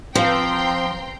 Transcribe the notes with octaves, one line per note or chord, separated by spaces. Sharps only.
F3 C4 F5 G5 A#5 C6